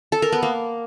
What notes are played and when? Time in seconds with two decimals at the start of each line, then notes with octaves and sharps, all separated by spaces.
0.12 A4
0.22 A#4
0.32 B3
0.43 A#3